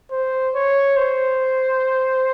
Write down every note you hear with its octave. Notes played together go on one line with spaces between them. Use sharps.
C5
C#5
C5